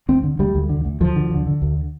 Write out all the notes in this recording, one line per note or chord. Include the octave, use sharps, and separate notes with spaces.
D2 C4
D3
D2 G3
D2
D3
D2
D2 F3
D3
D3
D3
D2